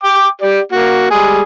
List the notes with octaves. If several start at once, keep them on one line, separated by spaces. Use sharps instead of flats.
G5 D6
G4 D5
A#3 F#4
G3 G#3 G#4